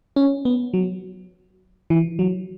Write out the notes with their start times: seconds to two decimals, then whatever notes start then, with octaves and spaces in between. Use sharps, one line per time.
0.16 C#4
0.45 B3
0.74 F#3
1.90 E3
2.19 F#3